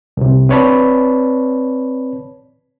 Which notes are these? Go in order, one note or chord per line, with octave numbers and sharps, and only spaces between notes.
C2 C3
C4 B4 C#5 D5 A5 B5